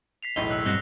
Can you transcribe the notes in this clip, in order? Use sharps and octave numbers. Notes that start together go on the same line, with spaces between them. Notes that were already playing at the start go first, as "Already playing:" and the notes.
B6 C7 F7
E1 B1 A2 D#5
E6 F#6
G2 C4 F#4 F#6 A#6 G7